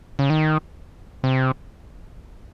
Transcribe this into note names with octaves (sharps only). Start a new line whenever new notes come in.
C#3
D#3
C3